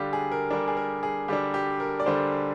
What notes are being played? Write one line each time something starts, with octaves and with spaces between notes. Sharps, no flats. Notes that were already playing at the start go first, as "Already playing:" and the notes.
Already playing: D3 G3 D4 G4 F5
G#4
A#4
D3 G3 D4 A#4
G#4
A#4
G#4
D3 G3 D4 G4
G4
A#4
D5
D3 G3 D4 C5